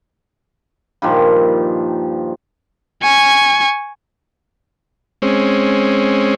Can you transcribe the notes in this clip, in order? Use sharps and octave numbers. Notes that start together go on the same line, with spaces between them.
G2 A#2 D#3 F3
G#5 C#6
G#3 C4 C#4